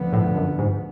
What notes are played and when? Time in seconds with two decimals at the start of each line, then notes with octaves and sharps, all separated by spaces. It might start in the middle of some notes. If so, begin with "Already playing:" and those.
Already playing: D2 D3 F3 B3
0.13 A2
0.36 F#2
0.59 G#2